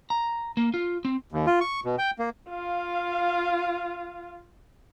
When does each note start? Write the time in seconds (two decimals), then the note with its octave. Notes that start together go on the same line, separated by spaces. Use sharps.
0.10 A#5
0.57 A#3
0.74 F4
1.05 C4
1.32 D#2
1.46 F4
1.61 C#6
1.85 B2
1.98 G5
2.19 A#3
2.49 F4 F5